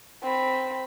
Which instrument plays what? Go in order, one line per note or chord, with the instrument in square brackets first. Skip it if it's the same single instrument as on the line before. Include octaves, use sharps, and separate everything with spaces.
[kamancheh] C4 B5